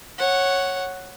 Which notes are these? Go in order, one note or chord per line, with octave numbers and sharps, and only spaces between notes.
C#5 F#5